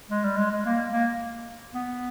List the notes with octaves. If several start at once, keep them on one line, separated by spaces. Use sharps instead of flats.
G#3
G3
G#3
G#3
A#3
A#3
B3